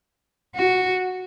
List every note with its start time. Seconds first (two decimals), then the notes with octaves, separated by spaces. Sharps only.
0.55 F#4